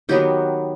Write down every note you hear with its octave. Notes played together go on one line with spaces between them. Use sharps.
D#3 F#3 B3 G4